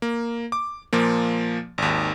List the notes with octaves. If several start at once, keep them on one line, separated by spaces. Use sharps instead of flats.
A#3
D6
A#2 F3 A#3
G#1 D#2